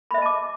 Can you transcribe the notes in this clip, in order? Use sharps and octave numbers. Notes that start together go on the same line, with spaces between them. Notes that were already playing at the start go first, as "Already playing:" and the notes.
D#5 E5 A5 B5 D6